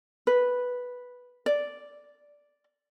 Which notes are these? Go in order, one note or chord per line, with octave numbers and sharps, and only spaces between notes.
B4
D5